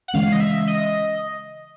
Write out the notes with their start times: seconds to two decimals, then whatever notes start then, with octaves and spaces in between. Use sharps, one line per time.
0.08 F#5
0.14 C#3 E3 G#3 C#4 F5
0.32 D#5
0.40 E5
0.67 D#5